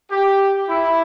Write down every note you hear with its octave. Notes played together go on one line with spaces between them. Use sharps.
G4
E4